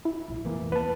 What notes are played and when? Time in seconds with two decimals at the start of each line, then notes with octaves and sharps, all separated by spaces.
0.05 E4
0.28 A#1
0.45 F1 E3 A#3
0.72 E2 B3 B4 A5